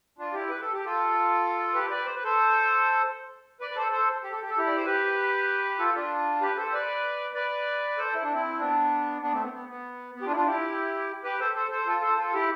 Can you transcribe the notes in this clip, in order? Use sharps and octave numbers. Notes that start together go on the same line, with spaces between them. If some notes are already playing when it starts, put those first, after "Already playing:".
D4 F4
E4 G4
B4
A4
G4
F4 A4
G4 B4
B4 D5
C5
B4
A4 C5
B4 D5
B4
A4 C5
A4 C5
G4
A4
G4
A4
E4 G4
D5
C5
G4 B4
F4 A4
D4 F4
G4 B4
A4 C5
B4 D5
B4 D5
A4 C5
E4
D4
C4 E4
B3 D4
B3 D4
A3 C4
B3
B3
B3
B3
G4
D4 F4
E4
D4 F4
E4 G4
G4 B4
A4 C5
A4 C5
A4 C5
F4 A4
A4 C5
F4 A4
E4 G4